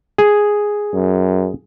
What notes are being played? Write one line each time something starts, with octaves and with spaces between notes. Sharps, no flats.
G#4
F#2